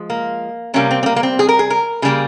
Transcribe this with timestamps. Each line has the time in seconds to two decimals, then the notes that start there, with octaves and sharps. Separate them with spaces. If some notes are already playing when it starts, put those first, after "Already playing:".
Already playing: F3 G#3
0.10 A#3
0.74 C3 G3 A#3 C#4
0.91 C4
1.03 C4
1.06 A#3
1.16 A#3
1.23 C4
1.39 G#4
1.49 A#4
1.59 G#4
1.70 A#4
2.02 C#3 G3 A#3 G#4